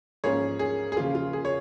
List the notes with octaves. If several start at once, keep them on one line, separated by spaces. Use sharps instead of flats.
G#2 F3 A#3 C#4 G#4 C#5
G#4
G#4
C#3 F3 A#3 F4
F4
G#4
C#5